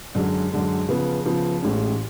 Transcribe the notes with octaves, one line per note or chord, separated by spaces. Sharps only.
F#2 D3 G#3
F#2 D3 G#3
C#3 F3 B3
C#3 F3 B3
A1 A2 G#3 C#4